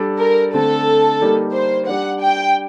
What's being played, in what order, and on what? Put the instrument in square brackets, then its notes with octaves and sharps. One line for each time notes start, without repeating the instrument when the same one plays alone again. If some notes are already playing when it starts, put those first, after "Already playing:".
Already playing: [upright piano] G3 D4 A4 D5
[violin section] A#4
[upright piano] D3 A3 C4 [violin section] A4
[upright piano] G3 A#3 D#4 G4
[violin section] C5
[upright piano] G3 D4 G4 [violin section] F#5
[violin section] G5